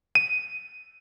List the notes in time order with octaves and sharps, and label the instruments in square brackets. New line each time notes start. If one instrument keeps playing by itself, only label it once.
[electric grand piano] D#7